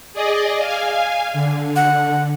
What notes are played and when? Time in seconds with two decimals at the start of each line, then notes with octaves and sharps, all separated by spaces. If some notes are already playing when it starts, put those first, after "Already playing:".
0.13 G#4 D5 D#5
0.59 F5 G#5
1.33 D3
1.76 F#5